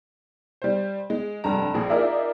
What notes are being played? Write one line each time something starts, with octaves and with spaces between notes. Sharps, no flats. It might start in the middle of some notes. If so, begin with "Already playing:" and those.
G3 C5
G#3
F1 G2 A#5
A#1 G#4
D#4 F4 G#4 A#4 D5 E5